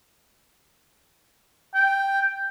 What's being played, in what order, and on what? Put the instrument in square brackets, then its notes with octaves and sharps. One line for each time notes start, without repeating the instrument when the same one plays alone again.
[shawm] G5